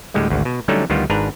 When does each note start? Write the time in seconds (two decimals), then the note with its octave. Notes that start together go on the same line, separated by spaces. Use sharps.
0.14 D2 A2 D3 G3 G#3
0.30 G#1 D2
0.45 B2
0.68 D3 F#3 G3 A3 C#4 D#4
0.90 D2 D#3 G3 B3 F4
1.10 G#1 G#2 D4 B4 A#5